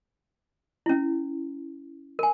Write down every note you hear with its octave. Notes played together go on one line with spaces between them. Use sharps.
C#4 E4
A#4 G#5